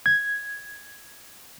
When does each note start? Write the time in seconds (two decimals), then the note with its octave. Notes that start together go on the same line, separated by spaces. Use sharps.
0.06 G#6